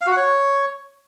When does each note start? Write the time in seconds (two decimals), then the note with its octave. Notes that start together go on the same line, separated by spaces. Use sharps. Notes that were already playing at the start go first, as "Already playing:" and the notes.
0.01 F5
0.06 F#4
0.12 F#5
0.17 C#5